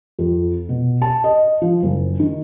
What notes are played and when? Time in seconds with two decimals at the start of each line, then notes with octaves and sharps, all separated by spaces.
0.19 F2
0.69 B2
1.02 A5
1.24 D#5
1.62 F3
1.83 F#1
2.20 D#3